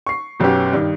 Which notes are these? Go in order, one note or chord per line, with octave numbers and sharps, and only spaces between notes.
C#6 C7
B1 F#2 B3 C#4 G4
G2 D#3